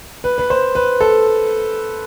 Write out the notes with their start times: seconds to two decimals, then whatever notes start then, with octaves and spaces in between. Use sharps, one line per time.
0.24 B4
0.38 B4
0.50 C5
0.75 B4
1.01 A4